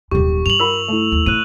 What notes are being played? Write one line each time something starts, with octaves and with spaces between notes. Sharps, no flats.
D#1 F#2 G4 C#6
G2 F7 F#7
F4 A#4 B5 E6
A3 E4
D#2
A2 F#6 D#7